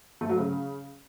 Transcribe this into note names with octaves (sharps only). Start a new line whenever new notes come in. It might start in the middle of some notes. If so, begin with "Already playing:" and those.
A3
F#3
C#3